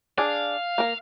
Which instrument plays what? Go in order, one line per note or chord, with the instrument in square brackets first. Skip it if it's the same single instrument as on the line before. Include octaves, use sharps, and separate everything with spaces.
[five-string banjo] D4 G#4 [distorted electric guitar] F5
[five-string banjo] A#3 A#4